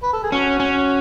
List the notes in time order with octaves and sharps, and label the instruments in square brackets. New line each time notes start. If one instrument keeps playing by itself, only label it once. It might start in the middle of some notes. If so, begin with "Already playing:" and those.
[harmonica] B4
A4
G#4
[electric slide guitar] C#4 [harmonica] F#4
[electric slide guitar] C#4